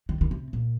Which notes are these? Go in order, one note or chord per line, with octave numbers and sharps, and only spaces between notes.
D#3
D#3
C3
A#2